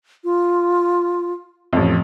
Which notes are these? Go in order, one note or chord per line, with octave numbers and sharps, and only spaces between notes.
F4
A1 F2